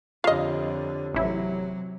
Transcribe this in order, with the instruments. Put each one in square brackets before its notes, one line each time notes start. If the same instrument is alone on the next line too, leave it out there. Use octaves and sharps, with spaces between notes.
[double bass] F2 D3 [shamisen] F4 D#5 [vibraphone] G4 C#5 [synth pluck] F5
[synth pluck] A1 E4 [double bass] C3 F#3